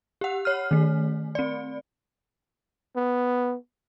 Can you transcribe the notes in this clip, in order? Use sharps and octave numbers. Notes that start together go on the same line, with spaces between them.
G4 F#5
C#5 F6
D#3 A3
C4 D5
B3